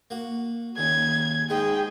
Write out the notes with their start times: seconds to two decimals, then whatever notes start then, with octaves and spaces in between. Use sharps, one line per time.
0.10 A#3 F#4
0.78 D#2 C#3 G#6
1.50 G#2 G#3 G#4 G5